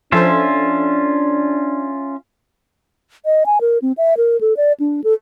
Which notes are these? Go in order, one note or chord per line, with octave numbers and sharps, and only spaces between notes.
F3 C#4 D4 F4 A4 C5 E5
D#5
G#5
A#4
C4
E5
A#4
A4
D5
D4
A4